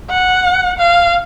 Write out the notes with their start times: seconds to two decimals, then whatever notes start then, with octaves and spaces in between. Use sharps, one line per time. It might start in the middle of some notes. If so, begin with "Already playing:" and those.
0.10 F#5
0.78 F5